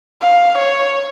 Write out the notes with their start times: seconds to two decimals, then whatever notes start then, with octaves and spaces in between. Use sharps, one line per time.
0.21 F5
0.58 C#5